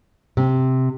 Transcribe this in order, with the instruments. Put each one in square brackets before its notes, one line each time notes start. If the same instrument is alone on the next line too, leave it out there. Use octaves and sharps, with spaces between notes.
[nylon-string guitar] C3